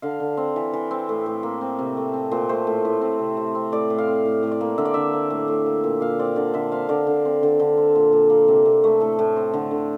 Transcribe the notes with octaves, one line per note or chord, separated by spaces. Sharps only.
D3 F5
D3
C4
E3
E3
C4
A2
A2
A#3
C4
C3
A3
C4
A#2 C5
A3 C5
A2
A2
C4
C3
C3
C4
A2 D5
A2
F5
C4
A2
A2
D5
A#3
D3 E5
D5
D3 E5
A#3
A2
A2
A#3
A#2
A#2 F5
C4 D5
D3 D5
D3 E5
C4 F5
D3 D5
D3
C4
D3
D3
C4
A#2
A#2
A#3
C3
C3
A3
A2 A4
A2
C4
D3
D3